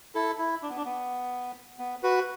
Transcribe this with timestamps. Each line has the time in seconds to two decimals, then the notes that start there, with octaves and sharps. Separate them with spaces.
0.15 E4 A4
0.39 E4
0.62 D4
0.69 B3
0.77 D4
0.86 B3
1.79 B3
2.03 F#4 B4